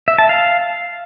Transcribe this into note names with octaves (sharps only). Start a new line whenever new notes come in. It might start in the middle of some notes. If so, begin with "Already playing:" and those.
E5
A5
F5